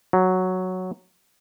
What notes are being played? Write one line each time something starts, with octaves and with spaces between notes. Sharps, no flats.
F#3